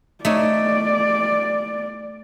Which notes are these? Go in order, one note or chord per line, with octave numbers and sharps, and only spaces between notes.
A3 D#4 C#5 D5